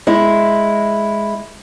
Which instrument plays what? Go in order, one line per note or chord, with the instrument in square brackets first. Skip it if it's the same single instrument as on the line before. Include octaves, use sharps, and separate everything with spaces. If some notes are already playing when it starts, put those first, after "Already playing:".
[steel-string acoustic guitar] G#3 E4